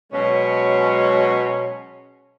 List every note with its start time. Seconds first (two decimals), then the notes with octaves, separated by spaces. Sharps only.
0.13 B2 F#3 G#3 C#4